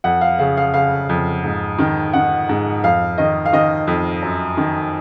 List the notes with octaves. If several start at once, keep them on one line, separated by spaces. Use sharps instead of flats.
F2 F#5
F5
C#3 F5
F5
C#3 F5
F2
G#2
D#3
D#3 F#5
G#2
F2 F5
D#3 D#5
F5
D#3 D#5
F2
F#2
D#3